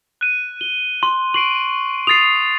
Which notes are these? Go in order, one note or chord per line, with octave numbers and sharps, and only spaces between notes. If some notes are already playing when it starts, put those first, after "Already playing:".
F#6 D#7
G7
C6
C#6 C7 D7 F#7
D#6 A6 C7 D7 F7